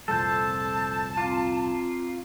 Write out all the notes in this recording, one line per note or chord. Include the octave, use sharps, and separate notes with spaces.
C2 F2 A#2 A4 C5 A5
C4 F4 A#5 D6